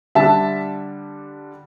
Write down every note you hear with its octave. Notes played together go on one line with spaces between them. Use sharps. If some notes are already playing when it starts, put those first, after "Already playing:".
D3 G3 D4 E5 A5